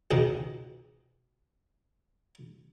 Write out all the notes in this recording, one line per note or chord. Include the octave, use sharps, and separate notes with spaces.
C#2 G#2 B2 D#3